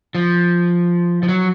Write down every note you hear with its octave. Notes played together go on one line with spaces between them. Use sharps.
F3
F3
F#3